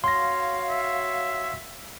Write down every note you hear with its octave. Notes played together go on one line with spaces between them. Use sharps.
F#4 C#5 F5 C6 A#6
E5